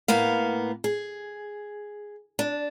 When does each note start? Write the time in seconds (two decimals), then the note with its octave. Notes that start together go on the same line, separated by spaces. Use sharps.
0.08 A2 A#3 B3 F5
0.84 G#4
2.39 D4